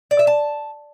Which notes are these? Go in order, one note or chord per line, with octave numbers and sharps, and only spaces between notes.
D5
E5
A5